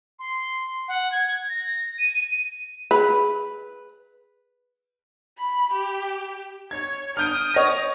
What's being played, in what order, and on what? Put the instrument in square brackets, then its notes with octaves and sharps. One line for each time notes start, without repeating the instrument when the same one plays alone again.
[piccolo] C6
F#5
G#6
A#6
D#7
[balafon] G#4 [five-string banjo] B4
[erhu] B5
G4
[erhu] C#5 [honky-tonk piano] G#6
[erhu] D#6 [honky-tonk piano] F6 G6 D7
[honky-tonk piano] C#5 A#6